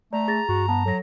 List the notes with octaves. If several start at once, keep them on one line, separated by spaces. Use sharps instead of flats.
A3 D5 A#5
G#4 A6 A#6
G2 F#4
B3 A5
F#3 A4 A#6